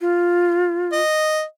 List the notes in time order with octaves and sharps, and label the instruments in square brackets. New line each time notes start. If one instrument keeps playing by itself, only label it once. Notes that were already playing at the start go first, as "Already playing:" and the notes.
[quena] F4
[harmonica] D#5